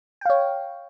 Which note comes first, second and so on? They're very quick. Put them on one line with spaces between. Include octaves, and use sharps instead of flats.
G5 F5 C#5